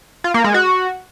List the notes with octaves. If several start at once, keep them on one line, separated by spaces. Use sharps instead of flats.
F4
A#3
G#3
F#4